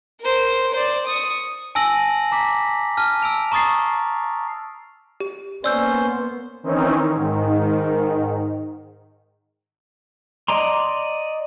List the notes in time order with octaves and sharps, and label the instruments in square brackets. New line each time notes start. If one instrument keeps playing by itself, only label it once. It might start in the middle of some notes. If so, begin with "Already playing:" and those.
[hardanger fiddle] A#4 C5
C5 D5
C#6 D#6
[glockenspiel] G#5 A5 E6 A#6 F#7
A#5 D6 B6
A5 F6
E6 D7 F7
A#5 C#6 D#6 A6 C7
[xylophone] G4
[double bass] A#3 B3 [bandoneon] C#4 C5 C6 [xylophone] D5 E6 G6
[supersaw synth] D#3 E3 C4 C#4 D#4
G#2 D#3
[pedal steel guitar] D5 D#5 A#5 C6